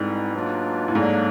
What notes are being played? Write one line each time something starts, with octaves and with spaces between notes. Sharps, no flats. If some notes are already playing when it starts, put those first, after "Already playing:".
Already playing: G#2 B2 G3 C4 E4 A4
B2 F#3 A#3 D4 F4
A2
G#2 D3 F#3 A#3 D4